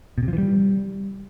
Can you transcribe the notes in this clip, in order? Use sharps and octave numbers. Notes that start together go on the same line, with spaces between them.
B2
C3
F3
E3
G3